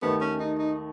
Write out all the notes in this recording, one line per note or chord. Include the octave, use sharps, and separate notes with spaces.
D#2 D#3 A3 B3
C#4
D#4
D#4